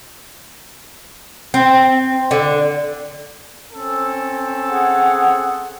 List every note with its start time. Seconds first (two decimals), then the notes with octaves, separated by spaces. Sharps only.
1.54 C4
2.31 D3
3.72 C4 C#4 A4
4.70 G#4 F#5